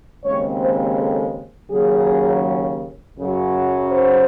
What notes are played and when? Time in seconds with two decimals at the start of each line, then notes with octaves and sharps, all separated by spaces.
0.24 D#2 C#3 G#3 C4 C#5
0.61 C5
0.99 A4
1.71 D#2 C#3 F#3 C#4 G#4
3.18 F#2 C#3 F#3
3.92 C5